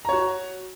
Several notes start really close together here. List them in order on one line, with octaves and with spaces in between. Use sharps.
A#5 C#5 F#4